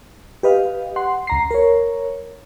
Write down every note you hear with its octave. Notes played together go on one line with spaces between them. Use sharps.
G4 B4 D#5 F5
F#5 C6
C#2 A#5 C7
A#4 C#5